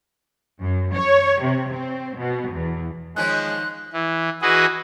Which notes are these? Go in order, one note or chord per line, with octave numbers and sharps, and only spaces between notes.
F#2
C#5
C3
C4
B2
E2
D#3 F3 G#3 C#4 F#6
E3
E3 F#4 G#4 B4 D#5